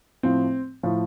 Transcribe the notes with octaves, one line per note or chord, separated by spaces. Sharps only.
A2 F3 C4
A2 F3